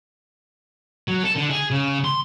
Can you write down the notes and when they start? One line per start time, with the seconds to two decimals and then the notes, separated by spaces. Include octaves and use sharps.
1.08 F#3
1.23 A4
1.36 D3
1.50 G#4
1.70 C#3
2.04 C6